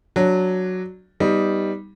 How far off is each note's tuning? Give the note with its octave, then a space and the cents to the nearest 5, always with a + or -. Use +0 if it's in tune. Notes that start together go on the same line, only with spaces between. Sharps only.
F#3 +0 D4 +0
G3 +0 B3 +5 D#4 +10